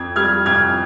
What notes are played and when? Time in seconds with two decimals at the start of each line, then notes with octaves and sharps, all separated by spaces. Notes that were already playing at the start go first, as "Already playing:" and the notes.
Already playing: F2 G#6
0.16 G3 F6 G#6
0.46 F2 F6 G#6